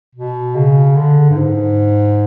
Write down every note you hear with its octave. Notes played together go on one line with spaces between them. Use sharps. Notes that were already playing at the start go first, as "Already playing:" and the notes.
B2
C#3
D3
G2
G#2